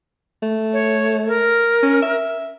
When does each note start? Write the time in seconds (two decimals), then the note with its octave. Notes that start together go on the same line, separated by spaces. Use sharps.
0.43 A3
0.73 C#5
1.28 A#4
1.83 C#4
2.02 E5